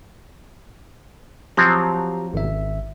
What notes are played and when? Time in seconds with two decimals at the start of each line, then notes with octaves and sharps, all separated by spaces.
1.57 F3 F#3 C4 G4 A#5
2.34 G#1 E5